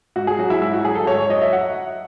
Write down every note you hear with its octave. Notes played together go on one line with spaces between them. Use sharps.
G#2 F#4
G#4
F#3 F#4
E4
G#2 E4
F#4
F#3 G#4
A4
G#2 C#5
C#5
F#3 D#5
E5
F#5